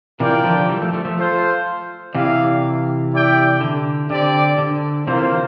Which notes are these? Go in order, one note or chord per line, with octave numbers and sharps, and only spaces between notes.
C3 E3 F4 A#4 D5 G5
D3 F3
E3 G3
F3 A3
F3 A3
F3 A3
F4 A4 C5
C3 E3 E4 G4 D5 F5
E4 G4 D5 G5
D3
D3 C4 G4 D5
D3
C3 E3 A#3 F4 C5